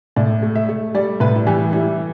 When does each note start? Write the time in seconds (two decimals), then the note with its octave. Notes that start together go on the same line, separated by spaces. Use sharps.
0.16 A2 D5
0.42 A3
0.56 E5
0.69 A3
0.94 G3 D5
1.20 A2 B4
1.36 E4
1.47 E3 G4
1.73 G3 E4